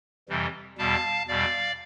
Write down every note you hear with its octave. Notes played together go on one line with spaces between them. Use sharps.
F2 C3 E3 G3
E2 B2 G3 F5 A5
E2 B2 G3 D5 F5